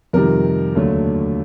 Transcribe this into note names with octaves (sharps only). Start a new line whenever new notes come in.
F2 C3 D#3 G3 A#4
D#2 D3 F#3 A3